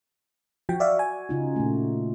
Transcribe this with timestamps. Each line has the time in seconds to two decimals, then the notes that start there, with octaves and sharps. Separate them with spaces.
0.69 F3 F#4 G5
0.80 D5 E5 F5
0.99 G#5
1.29 C#3 D#4 F4
1.56 A#2 A3